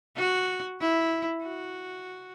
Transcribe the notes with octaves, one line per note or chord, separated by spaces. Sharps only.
F#4
E4
F#4